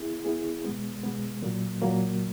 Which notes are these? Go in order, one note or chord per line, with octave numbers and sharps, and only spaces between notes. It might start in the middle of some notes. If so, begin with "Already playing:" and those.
Already playing: B3 E4 G#4
B3 E4 G#4
B2 G#3 B3
B2 G#3 B3
A#2 F#3 A#3
A#2 F#3 A#3